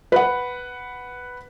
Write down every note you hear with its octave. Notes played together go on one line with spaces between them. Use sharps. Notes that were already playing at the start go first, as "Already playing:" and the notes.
B4 F#5